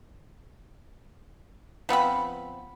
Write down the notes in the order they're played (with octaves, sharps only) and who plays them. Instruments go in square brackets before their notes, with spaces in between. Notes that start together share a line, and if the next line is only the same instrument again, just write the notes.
[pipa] F3 B3 C4 B5